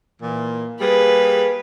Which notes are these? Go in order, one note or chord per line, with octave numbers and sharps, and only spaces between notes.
A#2 E3
G3 A#3 G#4 B4